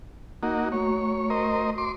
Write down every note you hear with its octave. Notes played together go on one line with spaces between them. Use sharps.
A#3 D#4 F#4
A3 F#4 C#5 A#5
A#4 C5 D#5
C6 D6